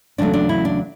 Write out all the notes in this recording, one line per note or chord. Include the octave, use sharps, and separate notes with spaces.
E2 C#3 F#3 A3 D4
D4
E4
D4